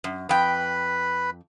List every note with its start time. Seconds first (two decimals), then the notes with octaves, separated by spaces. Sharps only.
0.04 F#2
0.29 F2 B4 G5 B5